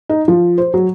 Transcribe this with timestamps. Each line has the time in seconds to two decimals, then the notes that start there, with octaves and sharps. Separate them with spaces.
0.09 D#4
0.28 F3
0.58 C5
0.74 F#3